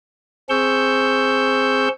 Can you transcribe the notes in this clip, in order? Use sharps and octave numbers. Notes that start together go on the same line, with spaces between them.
C4 G#4 C#6 E6 G6